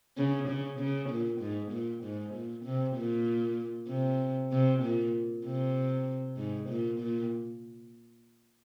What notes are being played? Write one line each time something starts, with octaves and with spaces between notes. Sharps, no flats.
C#3
C#3
C#3
A#2
G#2
A#2
G#2
A#2
C3
A#2
C3
C3
A#2
C3
G#2
A#2
A#2